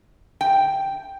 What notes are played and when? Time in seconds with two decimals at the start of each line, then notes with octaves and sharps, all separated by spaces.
0.41 G5